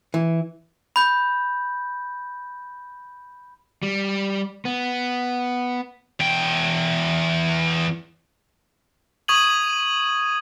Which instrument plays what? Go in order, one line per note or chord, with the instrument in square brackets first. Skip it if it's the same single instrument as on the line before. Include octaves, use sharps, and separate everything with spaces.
[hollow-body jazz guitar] E3
[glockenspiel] B5 G6
[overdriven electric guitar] G3
B3
[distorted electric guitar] E2 G5
[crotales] C#6 D#6 G#6 D#7 F#7